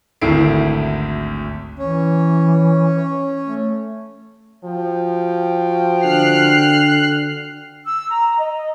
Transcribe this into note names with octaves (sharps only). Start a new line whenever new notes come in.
G#1 D2 E4 A4 C7 D7
E3 C#4
A3
F3 F#4 G5
D3 F6 F#6 C7
E6
A#5
D#5